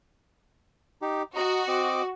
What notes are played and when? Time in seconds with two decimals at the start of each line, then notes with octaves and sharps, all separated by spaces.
1.02 D#4 G4
1.36 F#4 D#5 A#5
1.68 C4 D#5 D6